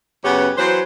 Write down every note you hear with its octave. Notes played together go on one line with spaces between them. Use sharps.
F#2 C#3 B3 C#4 G4 B4
E3 F#3 B4 C5